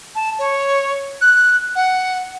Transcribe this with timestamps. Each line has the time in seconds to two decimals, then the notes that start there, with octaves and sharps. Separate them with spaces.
0.15 A5
0.38 C#5
1.21 F#6
1.75 F#5